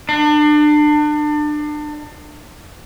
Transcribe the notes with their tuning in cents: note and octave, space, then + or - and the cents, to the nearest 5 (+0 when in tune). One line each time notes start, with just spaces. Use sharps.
D4 +30